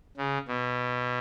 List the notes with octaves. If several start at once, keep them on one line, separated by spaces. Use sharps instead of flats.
C#3
B2